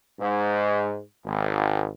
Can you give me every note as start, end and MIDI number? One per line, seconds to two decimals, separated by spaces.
0.19 1.00 44
1.24 1.91 32